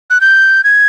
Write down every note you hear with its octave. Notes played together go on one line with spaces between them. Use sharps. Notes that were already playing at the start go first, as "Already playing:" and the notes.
F#6
G6
G#6